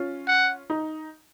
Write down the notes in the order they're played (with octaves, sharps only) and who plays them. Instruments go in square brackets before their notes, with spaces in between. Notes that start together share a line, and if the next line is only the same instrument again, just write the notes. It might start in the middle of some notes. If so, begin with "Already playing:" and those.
Already playing: [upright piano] C#4 F4
[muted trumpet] F#5
[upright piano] D#4